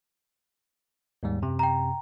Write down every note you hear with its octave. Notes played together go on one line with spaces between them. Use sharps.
D#2 G#2 G3
F#2 C3
G5 A#5